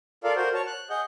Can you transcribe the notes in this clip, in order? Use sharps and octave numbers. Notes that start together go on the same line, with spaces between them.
F4 A4 A#4 D5 F5
F#4 A#4 C5
C#5 A5
F#6
G#4 D#5 F#5 G6